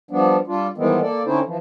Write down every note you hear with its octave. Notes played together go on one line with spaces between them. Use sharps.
F3 G3 B3 D4
G3 D4 F4
D#3 E3 G3 G#3 B3 C4
A#3 A4 D5
D3 C4 C#4 D#4 E4 C5
E3 F3